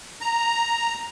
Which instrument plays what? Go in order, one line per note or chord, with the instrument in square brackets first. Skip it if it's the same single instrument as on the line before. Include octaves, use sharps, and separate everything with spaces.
[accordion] A#5